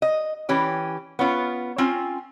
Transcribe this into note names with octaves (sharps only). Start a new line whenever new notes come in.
D#5
E3 C#4 G4
B3 C#4 F4
C4 C#4 F4